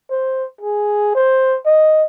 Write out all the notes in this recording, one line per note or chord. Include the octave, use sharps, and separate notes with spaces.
C5
G#4
C5
D#5